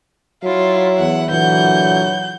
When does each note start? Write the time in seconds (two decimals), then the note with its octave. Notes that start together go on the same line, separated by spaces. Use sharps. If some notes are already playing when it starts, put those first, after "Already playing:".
0.44 F#3 E4 F4
0.98 E2 F#5
1.30 A#2 D3 E3 F#3 F#5 G6